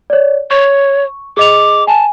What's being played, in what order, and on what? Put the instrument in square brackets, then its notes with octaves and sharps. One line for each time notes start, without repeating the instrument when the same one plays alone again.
[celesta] C#5 D5
[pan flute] C#5 [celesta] C#6
[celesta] G#4 D#5 F7 [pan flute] D6
[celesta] G#5 [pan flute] A5